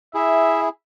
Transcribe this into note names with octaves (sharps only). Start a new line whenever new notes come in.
E4 G#4 E5